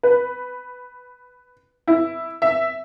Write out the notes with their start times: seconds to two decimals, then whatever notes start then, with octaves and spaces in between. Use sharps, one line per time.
0.03 B4
1.88 E4
2.42 E5